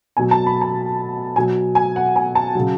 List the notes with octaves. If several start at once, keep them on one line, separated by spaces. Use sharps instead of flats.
B2 F#3 G#5
A5
B5
A5
B2 F#3 G#5
G#5
F#5
G#5
A5
C#3 F#3